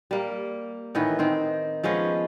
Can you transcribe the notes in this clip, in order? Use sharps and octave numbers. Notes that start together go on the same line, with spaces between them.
G3 A#3
A2 D#3 E3 B3
D#3 C4
F3 G#3 B3 C#4